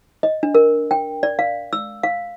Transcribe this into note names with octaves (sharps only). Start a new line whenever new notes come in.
D#5
D4
A#4
G5
D5
F5
E6
F5